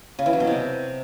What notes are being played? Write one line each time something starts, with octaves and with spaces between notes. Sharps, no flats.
C#3
E3
F#3
B2
C3